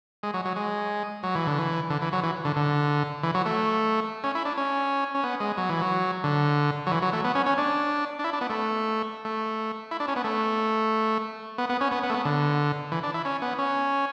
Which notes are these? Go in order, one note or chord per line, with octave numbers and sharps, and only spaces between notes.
G#3
F#3
F#3
G#3
F#3
E3
D3
E3
D3
E3
F#3
E3
D3
D3
E3
F#3
A3
C#4
E4
D4
C#4
C#4
B3
G#3
F#3
E3
F#3
D3
F#3
E3
F#3
A3
B3
C#4
C#4
D4
D4
E4
D4
B3
A3
A3
E4
D4
C#4
B3
A3
B3
B3
C#4
B3
B3
A3
B3
D3
E3
D4
E4
C#4
B3
C#4